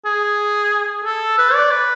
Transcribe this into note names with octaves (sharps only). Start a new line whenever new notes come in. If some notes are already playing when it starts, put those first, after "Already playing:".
G#4
A4
B4
D5
B4